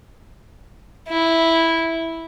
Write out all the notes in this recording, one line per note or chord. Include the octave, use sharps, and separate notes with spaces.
E4